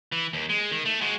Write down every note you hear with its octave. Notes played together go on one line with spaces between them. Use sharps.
E3
D#2
G#3
D#3
A3
G#3 F#4